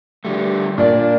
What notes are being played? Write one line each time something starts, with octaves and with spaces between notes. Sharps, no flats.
D3 G3 A3
A#2 D4 D5